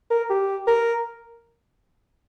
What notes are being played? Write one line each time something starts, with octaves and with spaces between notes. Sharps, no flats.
A#4
G4
A#4